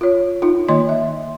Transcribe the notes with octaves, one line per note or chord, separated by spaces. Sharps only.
F4 C#5
D#4 F4
D#3 A#3 D#5 C6
E5